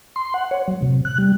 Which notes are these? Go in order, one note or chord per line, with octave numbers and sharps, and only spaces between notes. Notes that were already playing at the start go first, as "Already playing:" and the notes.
C6
F#5
C#5
F#3
C3
F#6
G3